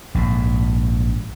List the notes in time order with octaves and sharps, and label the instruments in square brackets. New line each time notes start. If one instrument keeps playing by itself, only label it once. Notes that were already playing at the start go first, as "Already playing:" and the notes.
[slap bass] A#1 G#2